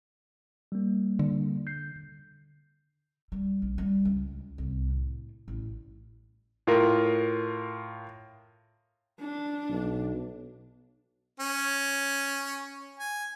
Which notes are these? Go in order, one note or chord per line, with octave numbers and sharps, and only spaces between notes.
G3 A#3
D3
G6 C7
G3
A#1
G3
C#2
C2
A2
A1
A2 F4 A#4
D4
B1
C#4
G#5